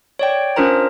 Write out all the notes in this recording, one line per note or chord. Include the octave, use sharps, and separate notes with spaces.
C#5 D5 G5
C#4 D4 F4 A#4 C5 A#5